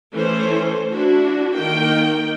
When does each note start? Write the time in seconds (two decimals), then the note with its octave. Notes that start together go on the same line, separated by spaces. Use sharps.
0.13 E3 A3 C#4 C5
0.91 D4 E4 F#4
1.56 D#3 A#3 G5